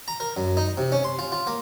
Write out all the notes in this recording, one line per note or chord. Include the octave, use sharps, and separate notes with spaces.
A#5
A#4
F#2
D#4
C3
C#4
C6
F4
F4
A#3